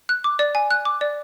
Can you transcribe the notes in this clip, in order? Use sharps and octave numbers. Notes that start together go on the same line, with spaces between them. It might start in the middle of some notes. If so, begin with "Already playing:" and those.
F#6
D6
D5
G#5
F#6
D6
D5